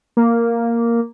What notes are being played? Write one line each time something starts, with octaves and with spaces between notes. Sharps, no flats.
A#3